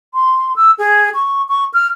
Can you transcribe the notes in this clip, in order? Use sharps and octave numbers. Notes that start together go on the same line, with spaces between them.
C6
E6
G#4
C#6
C#6
F6